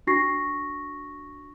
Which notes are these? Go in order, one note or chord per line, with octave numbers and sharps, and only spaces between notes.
D4 F#4 C#6 A#6 C7